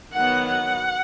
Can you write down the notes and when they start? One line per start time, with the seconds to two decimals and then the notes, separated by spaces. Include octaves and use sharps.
0.14 D#3 F#3 B3 F#5
0.48 F#5